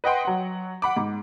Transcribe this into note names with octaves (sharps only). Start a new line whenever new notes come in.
B4 D#5 F#5 G5 C6
F#3 F#5
F#5 B5 D6
G#2